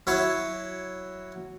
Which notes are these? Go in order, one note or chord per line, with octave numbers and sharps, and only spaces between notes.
F#3 E4 C#5